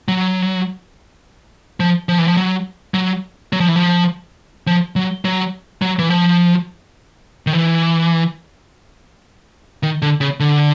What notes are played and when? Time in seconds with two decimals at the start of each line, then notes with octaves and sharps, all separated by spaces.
0.08 F#3
1.80 F3
2.09 F3
2.18 E3
2.28 F3
2.37 F#3
2.94 F#3
3.53 F#3
3.60 F3
3.68 E3
3.76 F3
4.67 F3
4.96 F#3
5.25 F#3
5.82 F#3
5.99 E3
6.10 F3
7.47 D#3
7.53 E3
9.83 D#3
10.02 D3
10.21 C#3
10.40 D3